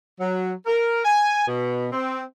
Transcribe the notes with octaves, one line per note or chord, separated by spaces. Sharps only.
F#3
A#4
G#5
B2
C4